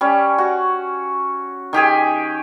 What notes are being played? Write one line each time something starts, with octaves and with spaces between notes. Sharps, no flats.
G3 C#4
F#4
D#3 G4 G#4 G#5